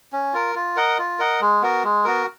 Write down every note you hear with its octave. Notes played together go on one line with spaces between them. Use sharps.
C#4
F4 A#4
F4
A#4 D#5 F#5
F4
A#4 D#5 F#5
G#3
B3 F#4 A#4
G#3
B3 F#4 A#4